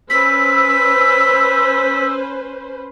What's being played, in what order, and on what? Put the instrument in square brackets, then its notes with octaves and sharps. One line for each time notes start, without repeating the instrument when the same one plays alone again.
[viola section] C#4 B4 C5 [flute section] E6 [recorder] B6